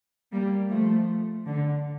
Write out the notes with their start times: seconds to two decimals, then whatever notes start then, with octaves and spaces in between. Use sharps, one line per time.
0.32 G3 A#3
0.70 F3 A3
1.46 D3